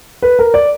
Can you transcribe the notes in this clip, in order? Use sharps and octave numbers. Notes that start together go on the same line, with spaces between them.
B4
A#4
D5